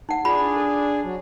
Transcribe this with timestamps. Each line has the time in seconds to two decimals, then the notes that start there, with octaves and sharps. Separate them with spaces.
0.09 D#4 F#5
0.25 D4 F4 G#4 B5
0.57 A4
1.03 F#3